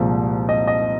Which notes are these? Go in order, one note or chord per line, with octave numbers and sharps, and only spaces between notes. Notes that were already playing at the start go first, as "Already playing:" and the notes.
Already playing: C2 A#2 F3 G#3
D#5
D#5